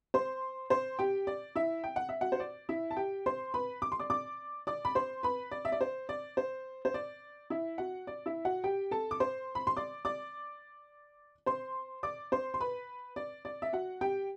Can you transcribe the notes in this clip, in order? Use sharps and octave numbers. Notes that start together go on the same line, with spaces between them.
C5 C6
C5 C6
G4 G5
D5
E4 E5
G5
F#5
E5
F#4 F#5
C5
D5
E4 E5
A5
G4 G5
C5 C6
B4 B5
D6
C6
D5 D6
D5 D6
D5 D6
B5
C5 C6
B4 B5
D5
E5
D5
C5
D5
C5
C5
D5
E4 E5
F#4 F#5
D5
E4 E5
F#4 F#5
G4 G5
A4 A5
D6
C5 C6
B5
C6
D5 D6
D5 D6
C5 C6
D5 D6
C5 C6
C6
B4 B5
D5
D5
E5
F#4 F#5
G4 G5